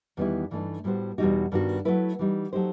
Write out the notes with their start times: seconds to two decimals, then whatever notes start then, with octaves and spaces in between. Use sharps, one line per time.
0.17 E2 D#3 G3 B3 E4
0.51 G2 E3 A3 D#4
0.84 A2 G3 B3 F#4 C5
1.18 E2 B2 G3 D#4 F#4
1.52 G2 D#3 G3 B3 F#4
1.85 F#3 A3 E4 B4
2.19 E3 G3 D#4
2.53 F#3 A3 D#4 G4 C5